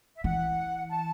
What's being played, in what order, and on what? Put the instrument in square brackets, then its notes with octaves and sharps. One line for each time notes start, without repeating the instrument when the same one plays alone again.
[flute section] E5
[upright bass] E3 [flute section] F#5
[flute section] A5